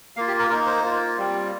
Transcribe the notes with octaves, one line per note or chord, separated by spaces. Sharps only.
A#3 F4 F5
G4
A#4
A#3 D#4 A#4
C5
A#3 F4
G3 C4 F4